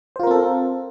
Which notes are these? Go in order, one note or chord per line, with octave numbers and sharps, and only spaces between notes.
C4 F4 A4 A#4 C5